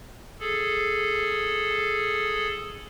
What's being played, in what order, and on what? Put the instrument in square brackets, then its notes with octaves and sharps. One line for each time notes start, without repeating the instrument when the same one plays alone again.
[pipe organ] G#4 A4